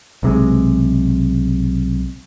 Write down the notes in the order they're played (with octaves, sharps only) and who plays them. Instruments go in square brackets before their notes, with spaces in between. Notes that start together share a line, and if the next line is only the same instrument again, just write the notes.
[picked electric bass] B1 C3 G#3